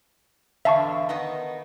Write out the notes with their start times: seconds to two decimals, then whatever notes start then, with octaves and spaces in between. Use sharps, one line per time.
0.65 E2 D3 E5 F5 A5 C#6
1.09 D#3 B3 D#4